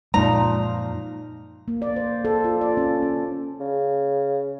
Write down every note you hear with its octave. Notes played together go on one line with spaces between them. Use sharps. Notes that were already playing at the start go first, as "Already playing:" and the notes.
F#2 A#2 F3 G#3 D#4 A#5
A#3
D5
C5
A4
F4
D5
C#4
C#4
C#3